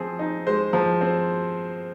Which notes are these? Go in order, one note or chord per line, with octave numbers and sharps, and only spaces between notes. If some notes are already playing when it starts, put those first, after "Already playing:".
Already playing: F3 C4 G#4
D#4
G#3 C5
F3
C4